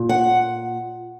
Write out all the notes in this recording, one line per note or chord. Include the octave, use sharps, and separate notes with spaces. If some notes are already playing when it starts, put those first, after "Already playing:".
Already playing: A#2
F#5